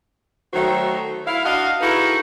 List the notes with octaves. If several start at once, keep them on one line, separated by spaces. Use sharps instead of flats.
D#3 F#3 A3 F#4 C5
E4 F5
D4 F#4 D#5 F5
D#4 E4 F#4 G#4 A4 B4